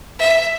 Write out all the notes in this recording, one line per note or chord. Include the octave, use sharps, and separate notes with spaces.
E5